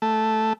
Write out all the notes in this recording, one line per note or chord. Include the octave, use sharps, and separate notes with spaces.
A3